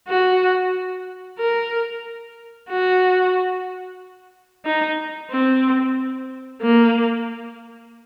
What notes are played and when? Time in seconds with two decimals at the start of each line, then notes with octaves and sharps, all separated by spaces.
0.08 F#4
1.39 A#4
2.70 F#4
4.65 D#4
5.31 C4
6.62 A#3